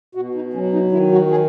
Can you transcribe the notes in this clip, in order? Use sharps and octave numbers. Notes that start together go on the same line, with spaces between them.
B2 F#4
D#4
F#3 C#4
D#4
D#3 E4
F#4
G#4